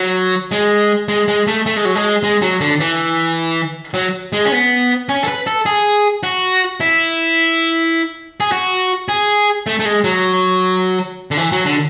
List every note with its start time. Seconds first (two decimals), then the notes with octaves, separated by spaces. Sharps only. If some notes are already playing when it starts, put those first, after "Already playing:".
Already playing: F#3
0.51 G#3
1.08 G#3
1.28 G#3
1.47 A3
1.66 A3
1.76 G#3
1.85 F#3
1.95 G#3
2.23 G#3
2.42 F#3
2.61 D3
2.80 E3
3.94 F#3
4.33 G#3
4.45 C#4
4.52 B3
5.09 C#4
5.23 A4
5.28 B4
5.47 A4
5.66 G#4
6.23 F#4
6.80 E4
8.40 G#4
8.52 F#4
9.08 G#4
9.66 A3
9.79 A3
9.85 G#3
10.04 F#3
11.31 D3
11.37 E3
11.52 F#3
11.66 D3